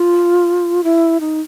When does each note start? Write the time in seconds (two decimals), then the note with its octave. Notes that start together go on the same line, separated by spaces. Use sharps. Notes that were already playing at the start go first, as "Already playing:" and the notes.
Already playing: F4
0.84 E4
1.20 D#4